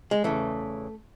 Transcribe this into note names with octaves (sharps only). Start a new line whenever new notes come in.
G#3
E2 C#3 E3 A3